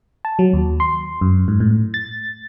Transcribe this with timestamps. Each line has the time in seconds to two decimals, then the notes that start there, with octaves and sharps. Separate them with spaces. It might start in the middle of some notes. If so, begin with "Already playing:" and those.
0.25 A5
0.39 F#3
0.53 D#2
0.80 C6
1.21 F#2
1.48 G#2
1.60 A2
1.94 A6